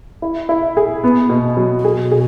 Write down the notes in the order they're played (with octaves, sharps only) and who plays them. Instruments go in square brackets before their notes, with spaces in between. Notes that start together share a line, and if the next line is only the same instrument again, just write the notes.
[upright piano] E4
E4
G#4
B3
B2
F#3
[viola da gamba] B2 [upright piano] G#4
[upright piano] G#4